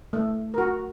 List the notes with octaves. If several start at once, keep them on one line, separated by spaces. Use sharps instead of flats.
A3
F#4 A#4